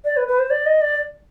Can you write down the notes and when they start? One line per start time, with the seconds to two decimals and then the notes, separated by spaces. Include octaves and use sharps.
0.05 D5
0.17 B4
0.28 B4
0.39 C5
0.50 D5
0.66 D#5
0.81 D5